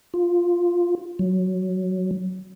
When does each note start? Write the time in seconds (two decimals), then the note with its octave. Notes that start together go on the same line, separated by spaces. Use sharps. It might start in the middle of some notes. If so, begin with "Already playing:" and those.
0.14 F4
1.19 F#3